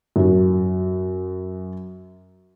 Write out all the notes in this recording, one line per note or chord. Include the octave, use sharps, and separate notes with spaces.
F#2 F#4